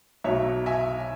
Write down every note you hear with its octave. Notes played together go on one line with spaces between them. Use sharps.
B1 B2 F#3 C#5 E5
E5 G#5